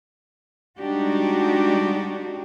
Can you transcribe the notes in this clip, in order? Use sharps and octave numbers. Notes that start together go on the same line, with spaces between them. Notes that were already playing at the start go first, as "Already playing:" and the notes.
G3 G#3 D4 D#4 F#4 G4